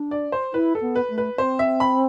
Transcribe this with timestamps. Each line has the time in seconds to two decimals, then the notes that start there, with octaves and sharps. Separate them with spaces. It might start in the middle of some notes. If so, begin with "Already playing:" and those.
Already playing: D4
0.11 D5
0.32 C5
0.54 E4 B4
0.75 A4
0.81 B3
0.96 B4
1.10 A3
1.18 B4
1.38 C4 C5
1.59 E5
1.80 B5